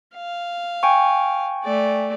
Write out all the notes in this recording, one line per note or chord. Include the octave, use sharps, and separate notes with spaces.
F5
G5 G#5 C#6
A3 D5